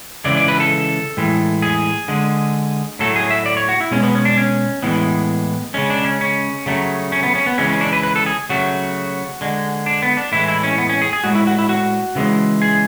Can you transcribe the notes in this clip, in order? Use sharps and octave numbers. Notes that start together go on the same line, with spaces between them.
C#3 E3 G#3 D5
D5
B4
A4
A2 E3 G#3
G#4
D3 G#3
A2 F#3 A3 A4
G#4
E5
D5
C#5
F#4
E4
B2 G#3 C#4
B3
C#4
D4
C#4
A2 E3 G#3 B3
C#3 G#3 C#4
D4
C#4
C#4
C#3 F#3 A3
C#4
B3
C#4
B3
C#3 E3 G#3 C#4
C#4
D4
B4
B4
A4
G#4
C#3 F#3 A3 F#4
D3 G#3
D4
B3
D4
A2 E3 G#3 E4
E4
C#4
B3
C#4
G#4
G#4
A2 G#3 F#4
E4
F#4
E4
F#4
C#3 E3 G#3
G#4